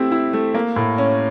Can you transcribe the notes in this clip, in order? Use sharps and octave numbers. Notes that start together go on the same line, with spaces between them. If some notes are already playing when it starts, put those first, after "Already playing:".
Already playing: A3 C4 E4 G4
E4
A3
A#3
A2
C#4